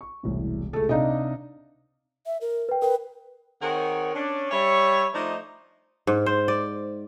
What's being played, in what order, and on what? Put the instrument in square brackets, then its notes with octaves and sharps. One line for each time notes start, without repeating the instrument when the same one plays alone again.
[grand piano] C#6
E1 C2 A2
[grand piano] C#2 G#4 [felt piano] A3 A4
[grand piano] C3 F5 [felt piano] D4 D#4 D#5
[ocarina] E5
A#4
[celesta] B4 G5
[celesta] A#4 G5 [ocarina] B4
[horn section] D#3 C4 G#4 A#4 C#5 F#5
C#4 D4
G3 C#5 E5
F3 A3 D4 D#4
[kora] G#2
C5
D5